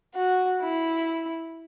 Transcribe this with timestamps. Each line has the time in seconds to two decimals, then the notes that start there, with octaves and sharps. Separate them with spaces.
0.14 F#4
0.62 E4